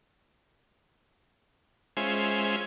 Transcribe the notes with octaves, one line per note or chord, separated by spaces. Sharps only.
G#3 C#4 F4 C5 E5 G#5